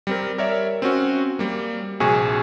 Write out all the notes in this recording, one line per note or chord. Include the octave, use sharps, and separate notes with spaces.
G3 C4 A#4
A#4 C#5 D5 E5
C4 C#4 F#4
G3 A#3
A#1 C3 F#4 G#4 G#5 C#6